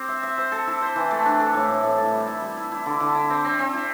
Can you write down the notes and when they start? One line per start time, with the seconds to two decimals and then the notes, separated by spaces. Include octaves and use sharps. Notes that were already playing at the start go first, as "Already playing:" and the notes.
Already playing: C4 G4
0.08 E5
0.23 E5
0.38 C5
0.52 A4
0.67 E4
0.81 C5
0.96 E3
1.11 A3
1.26 D4
1.40 A4
1.54 A2
1.69 A2
1.83 A2
1.98 A2
2.12 G3
2.28 E4
2.42 G3
2.57 E4
2.72 E4
2.86 D3
3.00 D3
3.15 E4
3.30 C4
3.45 C4
3.59 C4
3.74 E4